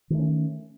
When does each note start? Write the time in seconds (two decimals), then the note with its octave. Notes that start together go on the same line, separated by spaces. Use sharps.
0.10 D#3
0.15 A3
0.19 C#4